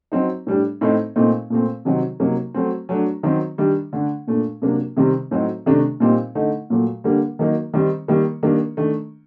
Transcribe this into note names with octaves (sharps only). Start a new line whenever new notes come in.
F#3 C4 D#4
A2 G3 D4
A2 A3 C4 D#4
A#2 A3 C4 D#4
A#2 A3 C4
C3 D#3 F#3 C4 D#4
C3 F#3 A#3 D#4
F#3 A3 C4
F#3 A3 D4
D#3 F#3 C4 D#4
D#3 G3 D4
D3 A3 D4
A#2 A3 D4
C3 F#3 A#3 D4
C3 D#3 G3 C4
A2 F#3 C4 D#4
C3 D#3 A3 D4
A#2 G3 C4 D#4
D3 A3 D#4
A#2 F#3 A3
D3 G3 A#3 D4
D#3 F#3 A#3 D#4
D#3 G3 C4 D#4
D#3 G3 A#3
D#3 G3 A#3 D4
D#3 A3 D4